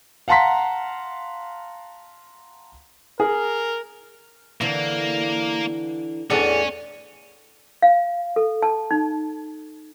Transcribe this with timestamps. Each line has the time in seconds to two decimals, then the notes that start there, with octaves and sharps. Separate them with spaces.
0.28 F5 F#5 A5 A#5 C6 B6
3.20 G#4 A#4
4.61 D3 E3 A#3
6.30 E2 A2 E3 C#4 D4 D5
7.82 F5
8.36 A4
8.62 A5
8.91 D#4